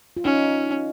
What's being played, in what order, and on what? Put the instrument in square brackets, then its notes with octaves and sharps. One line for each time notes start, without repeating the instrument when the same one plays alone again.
[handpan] F4
[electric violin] C#4 [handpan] D#4